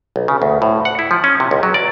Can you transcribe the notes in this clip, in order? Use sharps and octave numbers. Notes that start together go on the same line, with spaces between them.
B1
C#3
D2
A2
F#5
E4
F3
C#4
C3
C#2
F#3
D5